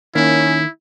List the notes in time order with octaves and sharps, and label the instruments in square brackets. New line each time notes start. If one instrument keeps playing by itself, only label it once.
[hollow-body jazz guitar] D#3 A#3 [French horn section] C#4 [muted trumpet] E4